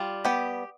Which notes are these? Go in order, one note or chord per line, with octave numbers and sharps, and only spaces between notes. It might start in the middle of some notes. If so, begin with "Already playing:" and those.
Already playing: G3 F4
B3 G4